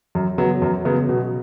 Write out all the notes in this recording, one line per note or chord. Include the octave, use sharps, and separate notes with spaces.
F#2
C#3 F#3 B3
F#2
C#3 F#3 B3
B2